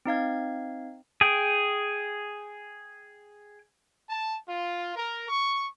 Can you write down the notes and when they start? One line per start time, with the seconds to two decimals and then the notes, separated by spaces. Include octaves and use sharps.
0.05 C4 D#4 F5 G#6
1.21 G#4 G5
4.08 A5
4.48 F4
4.96 A#4
5.28 C#6